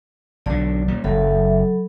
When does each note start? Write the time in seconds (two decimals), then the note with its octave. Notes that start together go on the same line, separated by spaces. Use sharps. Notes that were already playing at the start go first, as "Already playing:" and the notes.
0.46 B1 D3 D5
0.88 A#2 G3
1.04 F#1 F#3 A4 E5 B5